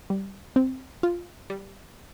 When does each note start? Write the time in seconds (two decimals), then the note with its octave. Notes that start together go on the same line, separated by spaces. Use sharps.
0.10 G3
0.56 C4
1.03 F4
1.50 G3